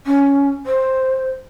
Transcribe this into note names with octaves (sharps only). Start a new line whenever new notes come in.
C#4
C5